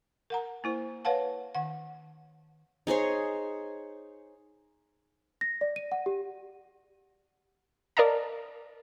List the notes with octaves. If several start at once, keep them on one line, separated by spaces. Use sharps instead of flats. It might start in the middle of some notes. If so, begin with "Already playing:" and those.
A#4 F#5 A#5
A#3 E4 C5
B4 C#5 F5 F#5 A5
D#3 F#5
D#4 G#4 C5 C#5
A#6
D5
D#7
F#5
G4
A#4 D5 D#5 F5 A5 A#5